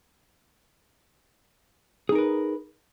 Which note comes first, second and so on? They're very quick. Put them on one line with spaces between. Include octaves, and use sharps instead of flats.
G#4 D#4 A#4 B4